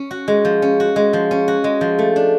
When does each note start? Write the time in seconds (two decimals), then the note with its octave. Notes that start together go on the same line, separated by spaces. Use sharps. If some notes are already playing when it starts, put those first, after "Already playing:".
Already playing: C#4
0.11 F#4
0.28 G#3
0.45 F3
0.62 C#4
0.80 F#4
0.96 G#3
1.13 F3
1.31 C#4
1.48 F#4
1.64 G#3
1.81 F3
1.99 A3
2.16 D4